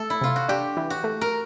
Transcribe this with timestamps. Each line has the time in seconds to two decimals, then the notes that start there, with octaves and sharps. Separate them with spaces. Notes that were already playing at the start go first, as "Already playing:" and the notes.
Already playing: A3 A4
0.10 E4
0.21 C3 F4
0.36 F#4
0.49 D4 G4
0.77 E3
0.90 F#4
1.04 A3
1.21 A#4